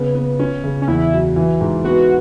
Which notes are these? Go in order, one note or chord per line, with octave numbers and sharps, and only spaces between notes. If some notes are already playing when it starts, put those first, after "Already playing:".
Already playing: C#3 B3
B3
C#4
C#3
C#4
E2 E4
F#3
E3
G#2
B3 F#4